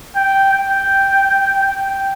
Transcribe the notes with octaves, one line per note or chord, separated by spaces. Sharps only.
G5
G5
G5